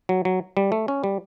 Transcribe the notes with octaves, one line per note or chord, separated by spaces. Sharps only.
F#3
F#3
G3
A3
C#4
G3